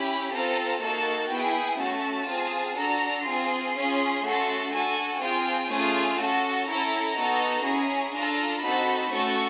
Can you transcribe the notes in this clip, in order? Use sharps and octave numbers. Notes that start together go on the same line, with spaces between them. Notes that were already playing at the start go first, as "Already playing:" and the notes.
Already playing: C#4 E4 G4 B5
C4 F4 A4 A#5
A#3 D#4 F#4 A4 A5
B3 E4 G#4 G5
A3 C#4 F#4 A5
C4 F4 G#4
D4 F#4 A4 A#5
C4 F4 G#4 C6
C#4 F4 G#4
A3 C#4 F#4 A4
D4 F#4 A4 G#5
C4 F4 G#4 G5
A3 C#4 F4 G#4 G#5
C#4 F#4 A4 A5
C#4 E4 A4 A#5
B3 D#4 F#4 A4
C#4 E4 G#4
D4 F4 A4 A#5
C4 D#4 F#4 A4 B5
A3 C#4 F#4 A4 C#6